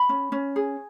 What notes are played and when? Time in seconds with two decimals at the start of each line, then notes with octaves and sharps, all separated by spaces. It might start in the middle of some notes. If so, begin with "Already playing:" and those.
Already playing: B5
0.09 C#4
0.32 C#4
0.56 G#4